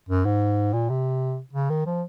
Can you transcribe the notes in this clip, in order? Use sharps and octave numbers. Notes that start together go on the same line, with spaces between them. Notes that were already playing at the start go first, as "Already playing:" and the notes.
F#2
G#2
A#2
C3
C#3
D#3
F3